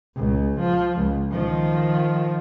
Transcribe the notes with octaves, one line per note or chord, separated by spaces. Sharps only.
C#2
F3
C#2
D#3 F3